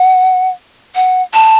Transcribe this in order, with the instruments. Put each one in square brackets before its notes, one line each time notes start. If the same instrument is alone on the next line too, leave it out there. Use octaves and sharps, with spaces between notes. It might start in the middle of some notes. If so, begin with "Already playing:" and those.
Already playing: [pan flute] F#5
F#5
A5